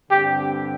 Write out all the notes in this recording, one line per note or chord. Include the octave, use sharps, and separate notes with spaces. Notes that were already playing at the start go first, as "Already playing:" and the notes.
G2 D3 G3 C4 G4